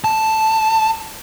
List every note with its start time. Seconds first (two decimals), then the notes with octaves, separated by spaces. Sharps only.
0.04 A5